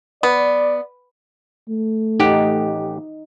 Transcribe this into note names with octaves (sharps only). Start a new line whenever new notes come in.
B3 D5
A3
A1 D#4 G4 F#5